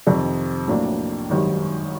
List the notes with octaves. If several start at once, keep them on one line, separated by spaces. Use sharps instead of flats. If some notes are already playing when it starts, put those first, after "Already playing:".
F2 C3 D#3
A#1 A2 F#3 A#3 D4
G#1 F#2 D#3 G3